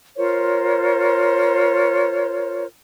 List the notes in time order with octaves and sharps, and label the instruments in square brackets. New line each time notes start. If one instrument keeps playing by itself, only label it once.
[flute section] F4 A#4 C5 C#5